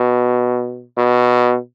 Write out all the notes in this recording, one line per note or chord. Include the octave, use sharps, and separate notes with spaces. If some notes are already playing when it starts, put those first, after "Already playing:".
Already playing: B2
B2